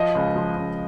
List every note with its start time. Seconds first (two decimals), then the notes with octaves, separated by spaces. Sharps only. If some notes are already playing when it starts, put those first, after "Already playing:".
Already playing: F3 D#5
0.15 C#2
0.36 F3
0.57 C#2